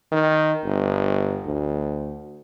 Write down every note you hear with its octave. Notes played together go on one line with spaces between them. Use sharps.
D#3
G1
D2